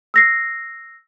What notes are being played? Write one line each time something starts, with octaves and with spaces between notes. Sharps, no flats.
E6 A#6 C7